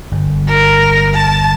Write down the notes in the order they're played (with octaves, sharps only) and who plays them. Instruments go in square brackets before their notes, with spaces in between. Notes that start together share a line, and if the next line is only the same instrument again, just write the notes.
[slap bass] G1
[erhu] A#4
A5